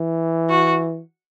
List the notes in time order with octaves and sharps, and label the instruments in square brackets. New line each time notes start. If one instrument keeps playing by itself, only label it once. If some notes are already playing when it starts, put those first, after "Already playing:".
Already playing: [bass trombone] E3
[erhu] F#4